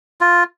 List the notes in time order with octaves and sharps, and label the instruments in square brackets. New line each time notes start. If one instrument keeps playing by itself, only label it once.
[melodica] F4